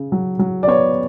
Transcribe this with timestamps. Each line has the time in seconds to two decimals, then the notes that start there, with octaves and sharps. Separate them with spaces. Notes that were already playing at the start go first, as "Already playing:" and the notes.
Already playing: C#3
0.12 F#3
0.39 F#3
0.63 D5
0.67 B3 C#5